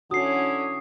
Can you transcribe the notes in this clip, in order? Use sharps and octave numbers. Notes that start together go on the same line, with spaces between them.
D3 C#4 E4 F#4 D#6 C7